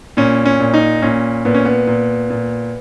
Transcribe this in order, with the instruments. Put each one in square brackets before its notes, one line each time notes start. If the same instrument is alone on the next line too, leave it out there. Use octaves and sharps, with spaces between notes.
[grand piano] A#2 C#4
C#4
A#2
D#4
A#2 C#4
A#2 B3
C#4
B3
A#2
A#2